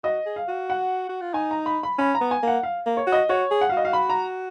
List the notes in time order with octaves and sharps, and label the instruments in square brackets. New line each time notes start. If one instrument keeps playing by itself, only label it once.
[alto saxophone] F#4 [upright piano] D#5
[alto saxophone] G#4
[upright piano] F5
[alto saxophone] F#4
[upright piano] F#5
[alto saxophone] F#4
F4
[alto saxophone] D#4 [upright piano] G#5
[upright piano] A#5
B5
B5
[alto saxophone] C#4 [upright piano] B5
[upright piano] A#5
[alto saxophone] B3
[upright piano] G#5
[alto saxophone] A#3 [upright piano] F#5
[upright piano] F5
[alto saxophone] A#3
[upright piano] C#5
[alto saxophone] F#4
[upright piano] D#5
[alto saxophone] F#4 [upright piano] C#5
[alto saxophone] G#4
[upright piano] F#5
F5
[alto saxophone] F#4 [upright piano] D#5
[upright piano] F5
B5
A#5